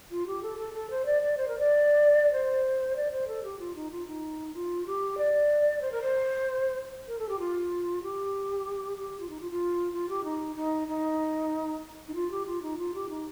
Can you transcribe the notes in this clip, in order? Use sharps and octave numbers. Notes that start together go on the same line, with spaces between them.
F4
G4
A4
A4
A4
C5
D5
D5
C5
A#4
D5
C5
D5
C5
A4
G4
F4
D#4
F4
D#4
F4
G4
D5
C5
A#4
C5
A#4
A4
G4
F4
G4
G4
F4
D#4
F4
F4
F4
G4
D#4
D#4
D#4
D#4
F4
G4
F4
D#4
F4
G4
D#4